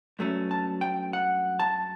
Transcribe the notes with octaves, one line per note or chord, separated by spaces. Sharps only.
G2 F#3 A3 C#4
A5
G5
F#5
A5